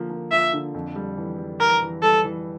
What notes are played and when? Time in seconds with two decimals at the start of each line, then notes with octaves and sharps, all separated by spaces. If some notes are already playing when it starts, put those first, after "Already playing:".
Already playing: D3 F3 A#3
0.10 A#3
0.31 F3 E5
0.53 D3
0.74 F2
0.96 G3
1.17 E3
1.38 G3
1.60 E3 A#4
1.82 E3
2.02 G3 A4
2.25 E3